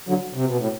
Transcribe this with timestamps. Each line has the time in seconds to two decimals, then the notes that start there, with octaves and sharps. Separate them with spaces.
0.09 D3 F#3
0.34 C3
0.46 B2
0.57 A2